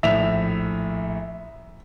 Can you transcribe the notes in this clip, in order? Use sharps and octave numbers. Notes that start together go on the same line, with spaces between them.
A#1 A2 E5 F7